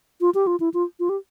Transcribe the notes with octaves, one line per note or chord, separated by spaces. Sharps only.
F4
G4
F4
E4
F4
F4
G4